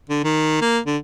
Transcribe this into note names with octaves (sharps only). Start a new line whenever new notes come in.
D3
D#3
A#3
D3